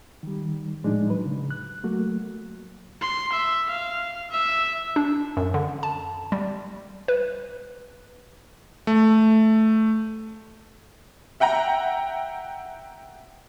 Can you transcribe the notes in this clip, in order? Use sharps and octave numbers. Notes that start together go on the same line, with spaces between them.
D#3 G3
A2 F3 G#3 D4 D#4
F#3 B4
C#3
F#6
F#3 A3 A#3 F#4
C6
E5
F5
E5
D4
F#2
D3
A5
G3
B4
A3
E5 F#5 G5 A#5